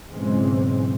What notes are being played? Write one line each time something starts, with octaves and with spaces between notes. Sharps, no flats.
B1 G#2 C#3 E3 G#3 C4